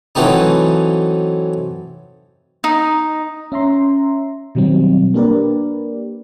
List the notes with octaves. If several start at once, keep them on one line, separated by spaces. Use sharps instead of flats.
E3 F#3 A3 C4 D#4
D#4
C#4 E5 A#5 C6
B2 D#3 F#3 G3 C4
A#3 D4 G4 A#4 B4 D5